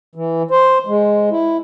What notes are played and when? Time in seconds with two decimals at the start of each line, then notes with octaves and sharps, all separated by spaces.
0.15 E3
0.51 C5
0.87 G#3
1.31 E4